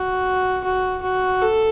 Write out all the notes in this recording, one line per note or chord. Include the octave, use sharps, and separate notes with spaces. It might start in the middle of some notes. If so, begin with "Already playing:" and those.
Already playing: F#4
F#4
F#4
A4